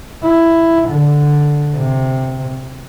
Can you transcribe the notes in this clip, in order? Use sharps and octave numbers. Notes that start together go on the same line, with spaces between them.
E4
D3
C3